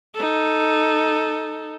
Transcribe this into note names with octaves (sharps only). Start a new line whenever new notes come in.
D#4 A4